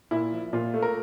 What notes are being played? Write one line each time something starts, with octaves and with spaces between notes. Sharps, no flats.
A#2 E4
F3
A#2 F4
A3
A#4